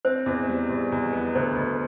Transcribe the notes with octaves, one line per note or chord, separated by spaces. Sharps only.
C4 C5
E2
G3
E2
E2
B3
D2 C5
D2